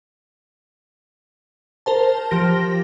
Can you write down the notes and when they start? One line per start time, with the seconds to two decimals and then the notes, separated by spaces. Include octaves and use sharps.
1.86 A#4 C5 A5
2.31 F3 G4 A#6